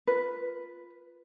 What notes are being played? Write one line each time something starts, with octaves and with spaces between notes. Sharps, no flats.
F4 B4